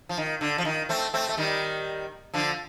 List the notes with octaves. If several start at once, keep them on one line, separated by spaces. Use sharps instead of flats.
F3
D#3
D3
F3
D#3
A3 C4
A3 C4
A3
D#3 G3
D3 F3